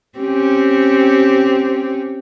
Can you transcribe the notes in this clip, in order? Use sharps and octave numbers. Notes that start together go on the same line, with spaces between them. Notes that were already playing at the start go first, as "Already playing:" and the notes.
C4 C#4 G4